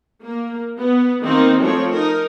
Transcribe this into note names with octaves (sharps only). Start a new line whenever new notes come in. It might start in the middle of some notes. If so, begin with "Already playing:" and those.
A#3
B3
D#3 A#3 C4 D#4
F3 A3 C4 C#5
D#4 A#4